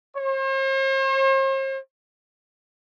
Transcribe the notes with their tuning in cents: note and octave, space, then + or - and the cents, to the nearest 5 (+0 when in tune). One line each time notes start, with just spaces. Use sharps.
C5 +45